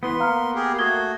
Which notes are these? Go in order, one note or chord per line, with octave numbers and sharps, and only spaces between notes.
E3 B3 B4 C6
A#3 F5 A#5 F6
G4 G#4 A#4
A3 F#4 D#6 G#6 G7